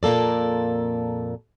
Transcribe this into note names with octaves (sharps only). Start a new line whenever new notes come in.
F2 A#2 A#3 A4 D5